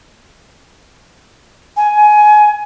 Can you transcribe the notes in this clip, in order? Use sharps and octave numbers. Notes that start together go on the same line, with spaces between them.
G#5